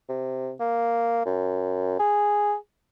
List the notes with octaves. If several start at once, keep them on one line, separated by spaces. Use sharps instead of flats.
C3
A#3
F#2
G#4